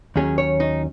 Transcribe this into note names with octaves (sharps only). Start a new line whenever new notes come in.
D#2 D#3 F#3 C#4 G#4
C#5
D#4